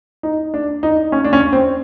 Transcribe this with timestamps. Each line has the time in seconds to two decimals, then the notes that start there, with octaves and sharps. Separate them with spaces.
0.23 D#4
0.54 D4
0.83 D#4
1.12 C#4
1.24 D4
1.33 C#4
1.53 C4